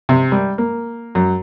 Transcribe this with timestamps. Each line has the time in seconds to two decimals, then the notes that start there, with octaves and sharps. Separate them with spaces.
0.09 C3
0.32 G3
0.58 A#3
1.15 F#2